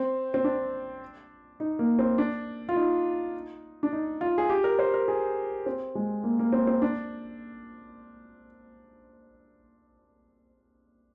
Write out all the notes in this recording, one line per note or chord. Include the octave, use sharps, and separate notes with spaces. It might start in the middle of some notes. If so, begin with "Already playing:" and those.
Already playing: C4
C4
D4
D#4
A#3
C4
D4
F4
D#4
D4
D#4
F4
G#4
G4
A#4
C5
A#4
G#4
C4
G#3
A#3
A#3
C4
C4
D4